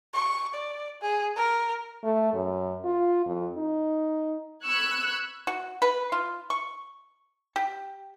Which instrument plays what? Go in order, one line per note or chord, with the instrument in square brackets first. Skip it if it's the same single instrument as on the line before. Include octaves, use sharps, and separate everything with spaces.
[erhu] C#6
D5
G#4
A#4
[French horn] A3
F#2
F4
F2
D#4
[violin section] B5 C#6 E6 F#6 G#6
[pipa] F#4
B4
F4
C#6
G4